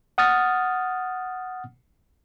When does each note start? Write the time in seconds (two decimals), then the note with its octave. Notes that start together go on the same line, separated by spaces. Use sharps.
0.18 F#5 D#6 F6 A6